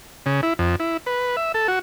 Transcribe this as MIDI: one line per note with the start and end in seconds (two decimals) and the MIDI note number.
0.26 0.41 49
0.43 0.54 64
0.59 0.76 41
0.80 0.97 64
1.06 1.36 71
1.37 1.52 76
1.54 1.67 69
1.68 1.79 66